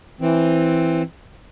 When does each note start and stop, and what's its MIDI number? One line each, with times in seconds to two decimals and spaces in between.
0.21 1.02 52
0.21 1.02 60